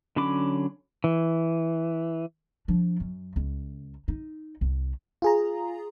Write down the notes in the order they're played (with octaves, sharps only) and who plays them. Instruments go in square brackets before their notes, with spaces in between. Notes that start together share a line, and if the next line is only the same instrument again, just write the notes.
[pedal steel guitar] D3 F#3 C#4 B5 D6
E3
[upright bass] F3 D4
F#2
C#2
D#4
C2
[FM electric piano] F4 G#4 A#5